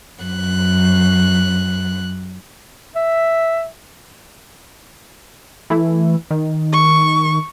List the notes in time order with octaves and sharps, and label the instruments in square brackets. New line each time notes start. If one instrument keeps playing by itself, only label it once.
[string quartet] F#2 F#6
[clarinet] E5
[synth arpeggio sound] E3 A3 E4
D#3
[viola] C#6